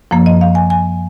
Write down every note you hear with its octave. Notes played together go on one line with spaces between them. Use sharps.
F#2 F3 A#3
D#5
F5
G#5
G#5